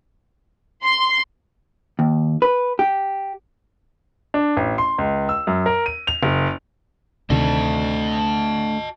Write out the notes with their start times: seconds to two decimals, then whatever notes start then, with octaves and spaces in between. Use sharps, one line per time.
0.84 C6
1.99 D#2
2.42 B4
2.79 G4
4.34 D4
4.57 A1
4.78 C6
4.98 C#2
5.29 E6
5.47 F#2
5.66 A#4
5.86 D#7
6.07 F7
6.23 F#1
7.30 D2 C3 D#3 A3 D4 D#5 A5